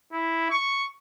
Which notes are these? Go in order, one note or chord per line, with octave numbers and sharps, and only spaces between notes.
E4
C#6